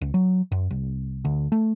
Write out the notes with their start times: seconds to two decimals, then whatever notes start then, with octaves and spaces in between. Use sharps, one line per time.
0.01 C#2
0.14 F#3
0.52 F#2
0.70 C2
1.25 D2
1.52 A3